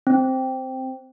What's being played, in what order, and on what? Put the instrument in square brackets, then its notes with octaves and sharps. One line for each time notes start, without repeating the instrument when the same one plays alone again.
[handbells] C4